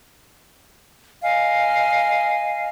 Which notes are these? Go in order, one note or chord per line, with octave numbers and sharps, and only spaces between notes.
D#5 F5 G#5